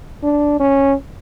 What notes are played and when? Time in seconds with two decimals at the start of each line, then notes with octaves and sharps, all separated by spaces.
0.23 D4
0.60 C#4